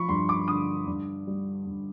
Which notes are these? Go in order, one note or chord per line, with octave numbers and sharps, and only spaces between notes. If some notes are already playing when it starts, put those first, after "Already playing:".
Already playing: F3 B5 C#6
G2 C6
D6
D3 D#6
G2
G3
G2